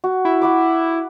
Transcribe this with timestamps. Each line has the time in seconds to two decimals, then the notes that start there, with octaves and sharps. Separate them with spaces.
0.04 F#4
0.25 E4
0.42 F#4 B5 D6